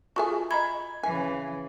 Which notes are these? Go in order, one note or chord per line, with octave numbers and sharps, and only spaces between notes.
F4 F#4 G#4 A4 E5 G#5
D#5 A#5 B5 G#6
C#3 E3 G#5